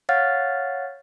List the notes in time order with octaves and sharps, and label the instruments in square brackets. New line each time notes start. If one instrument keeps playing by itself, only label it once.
[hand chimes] C#5 F5 F#5 F6 A6